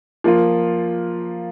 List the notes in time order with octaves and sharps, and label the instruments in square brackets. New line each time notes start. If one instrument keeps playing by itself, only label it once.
[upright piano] F3 A#3 F4